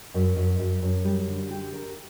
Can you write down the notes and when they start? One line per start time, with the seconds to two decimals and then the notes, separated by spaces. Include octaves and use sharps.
0.14 F#2
0.36 F#2
0.59 F#2
0.82 F#2
1.04 G3
1.27 D3
1.51 G4
1.73 A#4